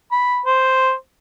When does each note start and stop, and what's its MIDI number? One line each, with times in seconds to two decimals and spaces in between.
0.11 0.41 83
0.46 0.93 72